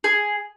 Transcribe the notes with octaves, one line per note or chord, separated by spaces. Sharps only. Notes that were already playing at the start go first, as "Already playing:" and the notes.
G#4